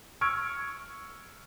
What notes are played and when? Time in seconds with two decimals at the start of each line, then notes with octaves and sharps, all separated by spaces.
0.21 C#6 E6 F6 G#6 D7